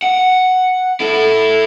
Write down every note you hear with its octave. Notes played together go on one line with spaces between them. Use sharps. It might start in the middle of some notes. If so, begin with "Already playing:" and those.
F#5
E4 A4